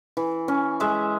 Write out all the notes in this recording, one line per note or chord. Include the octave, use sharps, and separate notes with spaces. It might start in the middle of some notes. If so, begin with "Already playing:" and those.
E3
C#4
G#3 E5